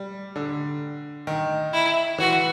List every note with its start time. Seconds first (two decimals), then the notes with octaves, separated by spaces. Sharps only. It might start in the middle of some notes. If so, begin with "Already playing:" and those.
Already playing: G3
0.36 D3
1.27 D#3
1.73 E4
2.18 E3 F#4